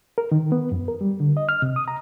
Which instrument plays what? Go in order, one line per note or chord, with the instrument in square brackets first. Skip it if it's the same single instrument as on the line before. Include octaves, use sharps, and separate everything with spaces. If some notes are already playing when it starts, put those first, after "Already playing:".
[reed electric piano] A#4
D#3
B3
F#2
A#4
G3
D3
D#5
F6
C3
D#6
A#5